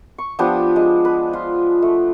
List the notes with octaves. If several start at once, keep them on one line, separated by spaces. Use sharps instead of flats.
C#6
F3 B3 D4 G4
G#3
B4
F4
A3